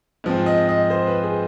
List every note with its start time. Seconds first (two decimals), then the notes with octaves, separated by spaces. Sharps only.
0.24 G#2 F3 C4
0.46 D#5
0.69 D#5
0.90 C5
1.07 B4
1.24 G#4